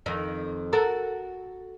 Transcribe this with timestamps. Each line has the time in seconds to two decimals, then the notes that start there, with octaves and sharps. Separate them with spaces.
0.06 F2 D#3 D#4
0.73 F#4 A4 A#4